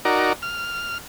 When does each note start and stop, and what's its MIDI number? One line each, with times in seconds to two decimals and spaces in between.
0.05 0.33 63
0.05 0.33 66
0.05 0.33 70
0.05 0.33 74
0.42 0.98 89